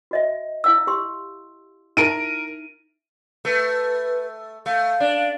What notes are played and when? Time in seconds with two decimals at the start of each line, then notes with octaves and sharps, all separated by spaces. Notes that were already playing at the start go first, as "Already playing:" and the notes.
0.11 F#4 D#5 E5
0.64 E4 F5 E6
0.87 G4 C6
1.97 D#4 E4 A#4 E5 D7 D#7
3.45 A3 B4
4.66 A3 F5
5.00 D4